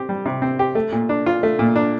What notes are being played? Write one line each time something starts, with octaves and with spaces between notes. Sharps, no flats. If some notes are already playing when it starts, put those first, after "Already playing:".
Already playing: C4 G4
G3
C3
C4
G4
A3
A#2
D4
F4
A3
A#2
D4